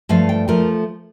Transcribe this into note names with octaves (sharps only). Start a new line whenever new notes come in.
G2 F3 A3 F5
G5
F3 A3 A#4